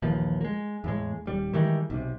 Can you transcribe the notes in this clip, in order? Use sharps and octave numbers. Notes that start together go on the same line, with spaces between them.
A#1 D#2 E3 F3
G#3 A#3
E2 A2 G#3
D#1 G3
D#3 E3 G3 G#3
B1 C3